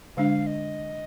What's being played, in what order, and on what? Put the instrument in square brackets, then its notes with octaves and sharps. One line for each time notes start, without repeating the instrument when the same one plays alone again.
[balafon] D3 G#3 D4 [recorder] F5
[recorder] D#5